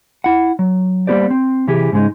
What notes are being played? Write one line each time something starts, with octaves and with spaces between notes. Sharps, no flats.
E4 F#5
F#3
G3 A#3 B3 G4 C5 D5
C4
C3 E3 E4 G4 G#4
G#2 C#3 G#3 D#4